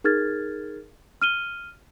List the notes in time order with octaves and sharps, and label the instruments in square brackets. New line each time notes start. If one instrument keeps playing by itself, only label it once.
[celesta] D#4 G#4 A#4 F6 G#6 A6
F6 D#7 G7